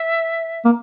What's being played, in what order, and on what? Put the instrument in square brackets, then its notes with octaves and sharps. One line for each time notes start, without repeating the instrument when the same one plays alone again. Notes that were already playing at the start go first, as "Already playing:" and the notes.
Already playing: [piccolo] E5
[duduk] A#3